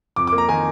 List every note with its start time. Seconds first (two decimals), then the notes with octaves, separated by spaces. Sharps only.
0.16 F2 D6
0.27 D6
0.33 A#3
0.38 A#5
0.49 D#3 G#5